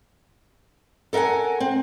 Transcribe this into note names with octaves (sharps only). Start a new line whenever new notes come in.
A4 A#4 E5 F#5 G#5
C4